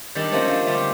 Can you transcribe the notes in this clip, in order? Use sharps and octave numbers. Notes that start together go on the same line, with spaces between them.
D#3 G3 D4 G4 A4
F3 A3 A#3 C4 C#4
D4
D3 G3 A3 D4 F4 G4